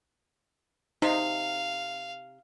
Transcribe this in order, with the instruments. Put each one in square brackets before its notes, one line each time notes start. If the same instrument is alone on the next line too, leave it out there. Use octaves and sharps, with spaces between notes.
[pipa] C3 [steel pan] D#4 [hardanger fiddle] F5